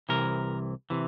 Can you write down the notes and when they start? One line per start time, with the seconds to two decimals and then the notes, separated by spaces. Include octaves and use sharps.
0.09 C2 C3 E3 A#4
0.90 C3 E3